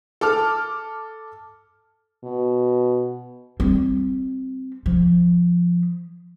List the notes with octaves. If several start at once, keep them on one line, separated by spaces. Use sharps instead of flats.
A4 D6 F6
B2
G3 C4
F3